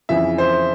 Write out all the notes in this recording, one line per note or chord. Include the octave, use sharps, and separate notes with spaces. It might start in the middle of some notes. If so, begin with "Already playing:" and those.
F2 C#3 E3 E5
C5